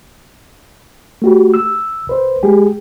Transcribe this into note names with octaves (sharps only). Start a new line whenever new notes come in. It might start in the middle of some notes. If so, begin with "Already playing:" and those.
A3 F#4 G4
E6
C2 B4 C5
G#3 G4 G#4